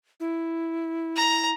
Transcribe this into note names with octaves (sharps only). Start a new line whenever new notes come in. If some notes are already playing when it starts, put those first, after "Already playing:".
E4
A#5